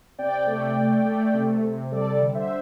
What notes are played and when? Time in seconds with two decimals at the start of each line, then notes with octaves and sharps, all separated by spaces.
0.19 C3 D5 G5
0.47 A3
0.76 A3
1.05 A3
1.34 C3
1.62 C3
1.92 G3 A4 D5
2.21 D3
2.35 C5 E5